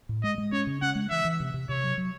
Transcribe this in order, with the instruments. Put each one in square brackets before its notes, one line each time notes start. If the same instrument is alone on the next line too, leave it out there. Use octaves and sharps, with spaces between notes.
[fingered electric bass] A2
[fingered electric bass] G#3 [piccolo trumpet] D#5
[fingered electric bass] G#3
[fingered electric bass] C#4 [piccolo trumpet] C#5
[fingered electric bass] C#3
[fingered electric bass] C#4 [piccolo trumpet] F#5
[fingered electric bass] G#3
[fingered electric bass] E3 [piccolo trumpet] E5
[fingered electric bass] E3
C3
C3
[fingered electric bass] C3 [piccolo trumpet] C#5
[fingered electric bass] F#3
F#3